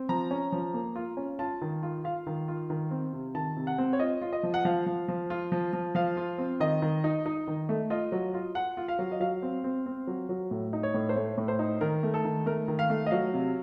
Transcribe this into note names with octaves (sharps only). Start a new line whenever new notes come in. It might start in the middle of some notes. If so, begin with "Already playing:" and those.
Already playing: C4
F3 A#5
C#4
F3
A#3
F4
C#4
F4 A5
D#3
F4
F4 F5
D#3
F4
D#3
C4
C3
D#3 A5
C3
F#5
C4
C#5
F4 D#5
F4
D#5
F3
F#5
F3 F5
F3
F3
F4
F3
F3
F3 F5
F4
C4
D#3 D#5
D#3
D#4
D#4
D#3
A3
F4 D#5
F#3
F4
F4 F#5
F4
F5
F#3
D#5
F#3 F5
C4
C4
C4
F#3
F#3
A2
D#4
C#5
A2
C5
A3 C#5
A2
C5
D#4
D#3 A#4
A3
A4
D#3
A3 A#4
D#3
F5
A3
D#5
F#3 F5
C3